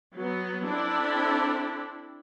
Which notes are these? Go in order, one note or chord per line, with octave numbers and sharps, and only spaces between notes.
F#3 B3
C4 D4 E4 A4